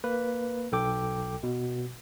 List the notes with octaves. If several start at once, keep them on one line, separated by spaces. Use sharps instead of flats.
A#3 B4
B1 A4 G5 D6
B2